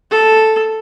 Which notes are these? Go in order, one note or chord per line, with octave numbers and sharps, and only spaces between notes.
A4